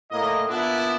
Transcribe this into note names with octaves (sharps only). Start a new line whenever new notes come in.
A2 A#3 D#5
A#2 B3 D4 E4